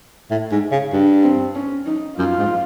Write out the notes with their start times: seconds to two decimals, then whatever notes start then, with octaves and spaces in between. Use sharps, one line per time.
0.30 A2
0.51 G#2
0.71 C#3
0.92 G2
1.24 C4
1.55 C#4
1.87 D#4
2.18 F#2 F4
2.38 G#2